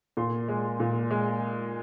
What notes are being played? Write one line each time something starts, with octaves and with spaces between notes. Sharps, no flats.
A#2 C6
G#3
A#2
G#3